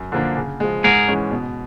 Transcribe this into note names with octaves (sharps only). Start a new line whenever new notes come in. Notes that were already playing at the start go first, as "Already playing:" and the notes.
Already playing: F#2
D3 F3 A#3 D4
C#3
F3 G#3
G#2 G#4 A#4
E3 G#3 C#4
B2